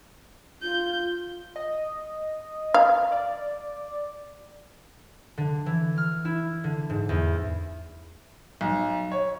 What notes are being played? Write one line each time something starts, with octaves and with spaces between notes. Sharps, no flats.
F4 G6
D#5
F5
D5
D3
E3
F6
E4
D3
G#2
E2
B1
C#5